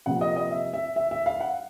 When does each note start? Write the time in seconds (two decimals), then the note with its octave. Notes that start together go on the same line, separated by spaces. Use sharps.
0.06 C3 F3 A#3 F#5
0.21 D#5
0.36 D#5
0.51 E5
0.73 E5
0.96 E5
1.11 E5
1.26 F5
1.40 F#5